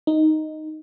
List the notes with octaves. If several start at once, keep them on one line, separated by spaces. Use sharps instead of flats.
D#4